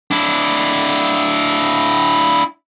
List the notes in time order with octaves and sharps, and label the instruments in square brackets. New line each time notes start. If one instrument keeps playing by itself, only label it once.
[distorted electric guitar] D4 E4